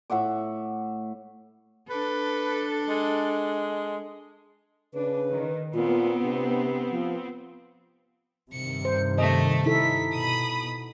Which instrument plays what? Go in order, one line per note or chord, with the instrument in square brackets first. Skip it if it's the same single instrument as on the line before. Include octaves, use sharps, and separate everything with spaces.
[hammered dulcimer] A2 E5 F#5 D6
[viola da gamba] D4 A4 [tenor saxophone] B4
[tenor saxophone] G#3
[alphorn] C#3 [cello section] D4 [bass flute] B4
[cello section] D#3
[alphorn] A#2 [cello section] B3 C4 [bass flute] F4
[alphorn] C3 [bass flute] D4
[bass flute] F3
[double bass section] G2 C3 D#3 [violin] C#7
[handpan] C5
[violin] A3 A4 [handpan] D#5
[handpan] D#4 E4 A4 [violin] B6
[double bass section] B2 [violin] B5 D#6